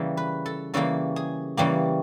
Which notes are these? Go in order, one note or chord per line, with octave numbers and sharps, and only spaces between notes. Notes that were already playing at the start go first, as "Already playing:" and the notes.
Already playing: C#3 E3 G3 A#3
B4
A4
C#3 E3 G3 A#3 A4
G#4
C#3 E3 G3 A#3 G4